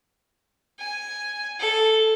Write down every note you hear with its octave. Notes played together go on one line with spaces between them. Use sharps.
G#5
A4